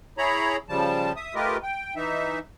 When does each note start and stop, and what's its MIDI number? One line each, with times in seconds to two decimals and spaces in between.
0.18 0.57 64
0.18 0.57 68
0.18 0.57 73
0.18 0.57 82
0.18 0.57 83
0.69 1.12 49
0.69 1.12 53
0.69 1.12 55
0.69 1.12 81
1.16 1.34 76
1.16 1.34 87
1.35 1.57 57
1.35 1.57 65
1.35 1.57 67
1.35 1.57 70
1.35 1.57 71
1.35 1.57 75
1.63 1.94 79
1.96 2.39 52
1.96 2.39 63
1.96 2.39 76